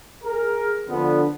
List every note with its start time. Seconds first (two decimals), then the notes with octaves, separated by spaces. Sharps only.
0.24 G#4 A#4
0.88 D3 F3 B3